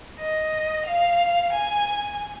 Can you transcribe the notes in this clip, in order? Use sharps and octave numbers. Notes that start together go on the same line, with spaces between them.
D#5
F5
G#5